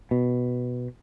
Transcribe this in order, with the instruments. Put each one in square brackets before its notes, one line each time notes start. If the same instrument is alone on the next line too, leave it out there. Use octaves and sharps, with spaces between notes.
[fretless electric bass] B2